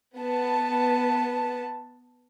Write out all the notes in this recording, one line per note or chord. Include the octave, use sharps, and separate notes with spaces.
B3 A5